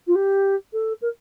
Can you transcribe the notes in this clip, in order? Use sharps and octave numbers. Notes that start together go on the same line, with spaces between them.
F4
G4
A4
A#4